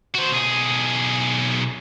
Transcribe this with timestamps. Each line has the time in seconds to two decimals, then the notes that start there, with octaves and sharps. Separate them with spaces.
0.15 F#4 C5
0.32 B1 G#4